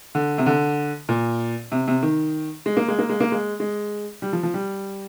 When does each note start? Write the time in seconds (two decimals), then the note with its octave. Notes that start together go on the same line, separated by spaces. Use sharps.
0.15 D3
0.38 C3
0.46 D3
1.09 A#2
1.72 C3
1.88 C3
2.03 D#3
2.66 G#3
2.77 A#3
2.88 G#3
2.99 A#3
3.09 G#3
3.20 A#3
3.32 G#3
3.60 G#3
4.22 G3
4.33 F3
4.43 F3
4.54 G3